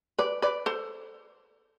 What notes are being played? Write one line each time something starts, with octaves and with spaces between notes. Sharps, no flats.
B4 D5
B4 D5
A4 C5